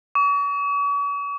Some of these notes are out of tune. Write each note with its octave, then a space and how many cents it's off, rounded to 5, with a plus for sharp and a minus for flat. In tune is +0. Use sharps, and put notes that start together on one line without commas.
C#6 +45